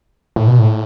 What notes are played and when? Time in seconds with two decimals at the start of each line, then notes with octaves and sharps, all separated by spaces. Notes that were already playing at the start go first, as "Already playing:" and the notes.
0.36 A2
0.48 B2
0.59 A2